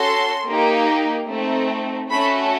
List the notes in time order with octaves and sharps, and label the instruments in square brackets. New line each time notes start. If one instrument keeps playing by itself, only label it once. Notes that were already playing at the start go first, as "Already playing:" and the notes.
Already playing: [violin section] C#4 F#4 A4 C6
A#3 D#4 G4
A3 C4 D#4
A3 C#4 F#4 A4 B5